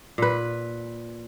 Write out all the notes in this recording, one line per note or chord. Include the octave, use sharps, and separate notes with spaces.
A#2 B4